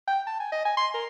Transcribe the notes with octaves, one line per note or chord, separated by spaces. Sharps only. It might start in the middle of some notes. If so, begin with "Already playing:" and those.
G5
A5
G#5
D#5
G#5
C6
A#4